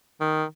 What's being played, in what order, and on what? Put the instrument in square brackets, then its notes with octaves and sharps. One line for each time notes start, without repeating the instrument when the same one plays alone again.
[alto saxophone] D#3